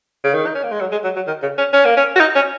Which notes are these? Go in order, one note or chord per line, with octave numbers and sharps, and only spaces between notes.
C#3
D#3
D#4
C#4
A#3
G#3
F#3
G#3
F#3
F#3
D#3
C#3
C#4
C#4
A#3
C#4
F#4
D#4
C#4